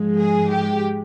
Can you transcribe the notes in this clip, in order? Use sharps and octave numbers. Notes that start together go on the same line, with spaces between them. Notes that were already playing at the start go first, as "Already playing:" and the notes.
Already playing: G#2 F3 G#3
G#4
G4